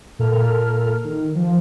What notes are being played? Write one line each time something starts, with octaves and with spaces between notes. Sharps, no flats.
A#2 A4 A#4 F6
D#3
F3